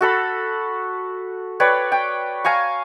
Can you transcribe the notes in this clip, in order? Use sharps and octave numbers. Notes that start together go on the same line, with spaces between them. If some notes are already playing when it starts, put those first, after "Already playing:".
F#4 A4 B5
B4 C#5 D5 G5
G5
F5 G#5 A#5 C#6